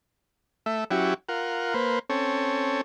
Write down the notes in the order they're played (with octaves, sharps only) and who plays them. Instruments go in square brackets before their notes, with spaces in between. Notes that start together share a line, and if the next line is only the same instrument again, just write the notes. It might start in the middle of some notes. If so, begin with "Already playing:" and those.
[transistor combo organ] A3 E5
F#3 C#4 E4 F#4 G4
F4 A#4 F#5
A#3 B4 C5
C4 C#4 A4 C#5